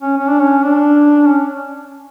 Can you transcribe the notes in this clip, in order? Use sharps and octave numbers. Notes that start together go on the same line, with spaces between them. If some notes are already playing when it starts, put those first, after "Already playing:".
C#4
C#4
D4
C#4
D4
C#4